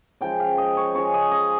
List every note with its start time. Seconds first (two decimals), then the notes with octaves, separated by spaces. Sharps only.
0.21 C#3 F3 G#3 G5
0.40 F5
0.58 D#5
0.77 C#5
0.95 C#3 F3 G#3 C#5
1.14 D#5
1.32 D#5